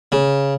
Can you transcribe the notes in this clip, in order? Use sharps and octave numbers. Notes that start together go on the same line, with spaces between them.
C#3